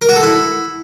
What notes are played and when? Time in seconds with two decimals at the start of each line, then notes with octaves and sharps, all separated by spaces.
0.02 A#4
0.09 F#4
0.16 A4
0.23 E4